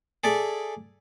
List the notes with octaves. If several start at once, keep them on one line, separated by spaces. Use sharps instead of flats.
G#4 A4 D5 E5